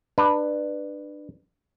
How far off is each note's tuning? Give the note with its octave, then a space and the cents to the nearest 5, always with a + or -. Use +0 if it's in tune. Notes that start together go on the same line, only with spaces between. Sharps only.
D4 +25 B4 +0